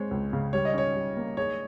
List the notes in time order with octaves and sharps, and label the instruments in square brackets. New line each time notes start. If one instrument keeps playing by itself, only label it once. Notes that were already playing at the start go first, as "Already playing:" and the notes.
Already playing: [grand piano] G#3 C4 [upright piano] C#5
[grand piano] C#2
C#3
[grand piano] G3 [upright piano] C#5
[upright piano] D#5
[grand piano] C#4 [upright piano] C#5
[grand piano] G3
A#3
[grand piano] G#4 [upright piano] C#5